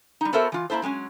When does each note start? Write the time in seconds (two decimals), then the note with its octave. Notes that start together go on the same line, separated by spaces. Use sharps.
0.21 G3 D#4
0.33 B3 F#4 A4 A#4 C5 E5
0.52 E3 F4
0.70 A#3 B3 E4 A4 C5
0.82 F#3 G#3 B3 C#4